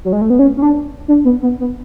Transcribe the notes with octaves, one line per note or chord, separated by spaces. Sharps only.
F#3
G#3
A3
B3
C#4
C#4
D4
D4
B3
B3
B3